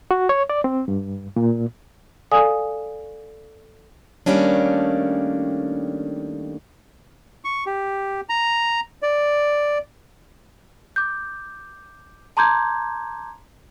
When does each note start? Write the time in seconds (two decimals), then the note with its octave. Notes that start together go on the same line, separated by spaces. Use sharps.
0.11 F#4
0.29 C#5
0.50 D5
0.64 C4
0.88 G2
1.36 A#2
2.32 A4 D5 F5 G#5 D#6
4.26 D#3 G3 A3 A#3 C#4 D4
7.44 C#6
7.66 G4
8.29 A#5
9.03 D5
10.96 D6 G6
12.37 A5 A#5 C6 D6 G6 G#6